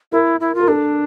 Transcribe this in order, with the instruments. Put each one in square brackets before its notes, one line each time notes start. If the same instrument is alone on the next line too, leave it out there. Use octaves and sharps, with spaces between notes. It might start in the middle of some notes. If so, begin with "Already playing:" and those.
[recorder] E4 [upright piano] A#4
[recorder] E4
F4
[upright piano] A#4
[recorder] D4 [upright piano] A4